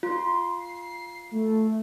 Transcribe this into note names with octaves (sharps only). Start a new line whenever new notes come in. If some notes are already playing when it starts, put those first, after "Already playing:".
F4 C6
C7
A3